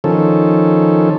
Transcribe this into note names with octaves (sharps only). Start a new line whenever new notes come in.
D#3 F3 C#4 A4